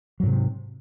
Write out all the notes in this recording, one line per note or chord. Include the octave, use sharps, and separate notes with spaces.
G#2 C3 F#3